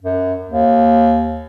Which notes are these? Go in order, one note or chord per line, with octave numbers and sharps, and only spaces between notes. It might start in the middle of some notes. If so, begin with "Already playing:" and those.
F#2
D#2